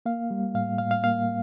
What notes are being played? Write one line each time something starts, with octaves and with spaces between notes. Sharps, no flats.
A#3 F5
G3
A2 F5
A2 F5
F5
A#3 F5